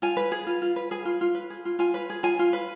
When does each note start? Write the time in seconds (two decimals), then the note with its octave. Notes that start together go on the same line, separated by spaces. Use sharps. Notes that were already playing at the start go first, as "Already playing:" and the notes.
0.02 F4 G#5
0.17 B4
0.32 G#4
0.47 F4
0.62 F4
0.76 B4
0.91 G#4 G#5
1.05 F4
1.21 F4
1.35 B4
1.50 G#4
1.65 F4
1.79 F4 G#5
1.94 B4
2.10 G#4
2.23 F4 G#5
2.39 F4
2.53 B4